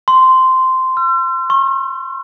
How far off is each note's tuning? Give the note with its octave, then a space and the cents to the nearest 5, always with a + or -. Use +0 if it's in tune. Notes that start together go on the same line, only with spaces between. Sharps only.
C6 -10
E6 +45
C#6 -45